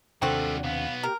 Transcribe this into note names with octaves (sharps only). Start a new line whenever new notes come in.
D#2 C3 G3 C4 D4 F4 F#4 A4
B1 B3 F5
G4 A#4